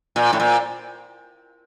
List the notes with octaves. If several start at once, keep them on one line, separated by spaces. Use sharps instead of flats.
A#2
A2
A#2